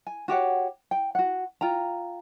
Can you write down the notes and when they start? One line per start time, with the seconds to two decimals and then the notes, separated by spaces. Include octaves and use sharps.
0.07 G#5
0.28 F#4 G4 C#5 F#5
0.91 G5
1.15 F#4 F#5
1.61 F4 G5 A#5